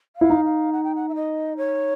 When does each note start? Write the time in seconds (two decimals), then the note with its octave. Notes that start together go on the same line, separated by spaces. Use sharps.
0.16 F5
0.21 E4
0.30 D#4
0.45 F5
0.73 F#5
0.84 G5
0.95 F#5
1.09 E5
1.15 D#5
1.57 C#5